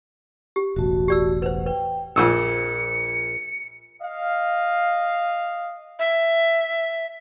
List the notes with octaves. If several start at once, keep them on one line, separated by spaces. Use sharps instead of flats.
G4
E1 A1 F#4 A5
G4 D5 E6
B4 C5 F#5
B4 G5
A#1 F2 A#2 E6 C#7
D#5 F5
E5